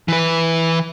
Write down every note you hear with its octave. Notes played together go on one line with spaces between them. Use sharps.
E3 B4